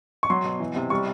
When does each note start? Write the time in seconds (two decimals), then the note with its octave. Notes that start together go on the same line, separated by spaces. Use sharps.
0.23 C#6
0.30 F#3 C6
0.45 B2
0.60 E3
0.76 C3
0.90 G3 C#6